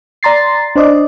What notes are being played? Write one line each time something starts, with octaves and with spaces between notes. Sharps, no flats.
D5 A#5 C6 A6 C7
D4 C5 D5 D#5